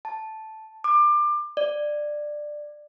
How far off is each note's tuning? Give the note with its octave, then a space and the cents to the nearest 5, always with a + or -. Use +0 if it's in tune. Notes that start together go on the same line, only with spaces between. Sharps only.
A5 -5
D6 +25
D5 +15